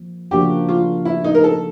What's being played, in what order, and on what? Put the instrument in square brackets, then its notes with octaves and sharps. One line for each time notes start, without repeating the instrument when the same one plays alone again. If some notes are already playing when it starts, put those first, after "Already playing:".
Already playing: [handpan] F3 A#3
[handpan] C#3 F3 A#3 D4 F#4 [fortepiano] G4
[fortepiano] F4
E4
D#4
A#4
A4